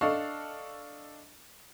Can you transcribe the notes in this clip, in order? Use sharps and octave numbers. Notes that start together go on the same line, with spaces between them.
D4 A4 D#5 F5 C#6